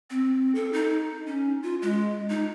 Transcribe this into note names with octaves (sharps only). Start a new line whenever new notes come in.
C4
A4
D#4
C#4
F4
G#3
D#4